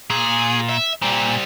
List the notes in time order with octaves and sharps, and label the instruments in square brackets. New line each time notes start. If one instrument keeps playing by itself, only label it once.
[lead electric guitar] A#2 [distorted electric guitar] G#4
[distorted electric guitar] E5
[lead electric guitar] A#2 [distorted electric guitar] G3 C4